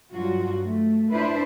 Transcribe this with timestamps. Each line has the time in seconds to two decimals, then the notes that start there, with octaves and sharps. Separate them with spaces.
0.13 G2 F#3 F4 F#4
0.65 A3
1.13 D4 E4 B4 C5